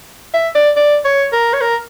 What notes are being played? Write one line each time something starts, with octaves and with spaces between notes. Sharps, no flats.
E5
D5
D5
C#5
A#4
C#5
A#4